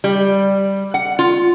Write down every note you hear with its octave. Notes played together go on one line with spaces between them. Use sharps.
G3
F#5
F4